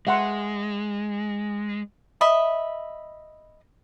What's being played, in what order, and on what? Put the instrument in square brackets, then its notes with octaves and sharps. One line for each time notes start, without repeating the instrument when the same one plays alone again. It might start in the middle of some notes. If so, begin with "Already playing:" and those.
[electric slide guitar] G#3 [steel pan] E5 F#5 C6
[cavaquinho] D#5 E5 B5